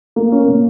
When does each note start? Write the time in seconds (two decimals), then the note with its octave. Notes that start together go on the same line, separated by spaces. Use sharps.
0.16 A#3
0.32 C#4
0.48 A#2